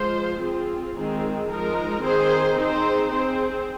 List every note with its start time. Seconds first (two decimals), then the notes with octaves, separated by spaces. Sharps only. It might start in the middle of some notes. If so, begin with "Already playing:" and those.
Already playing: F3 G#3 F4 C5
0.40 C4 F4 G#4
0.94 D#3 G#3 C4 G#4
1.48 F3 G#3 D#4 A#4
2.02 D#3 C4 G#4 C5
2.56 C4 D#4 G#4 C5
3.10 C4 G#4 C5